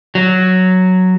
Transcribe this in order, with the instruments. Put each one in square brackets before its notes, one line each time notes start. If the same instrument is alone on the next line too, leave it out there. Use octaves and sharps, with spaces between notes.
[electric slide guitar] F#3